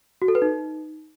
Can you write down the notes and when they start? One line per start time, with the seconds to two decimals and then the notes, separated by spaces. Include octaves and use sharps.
0.22 F#4
0.28 A4
0.35 B4
0.42 D#4